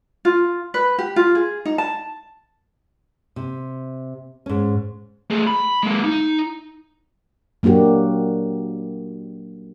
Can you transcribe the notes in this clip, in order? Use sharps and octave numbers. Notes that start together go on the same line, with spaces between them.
F4
B4
G4
F4
G#4
D#4
A5
C3
G#2 C#4
A3 G#4
B5
G#3 A#3
D#4
F#3 A#3 D4 F#4 G4